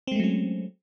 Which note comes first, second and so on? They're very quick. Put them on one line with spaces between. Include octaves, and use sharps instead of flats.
C4 G#3 A3 F#3 C#4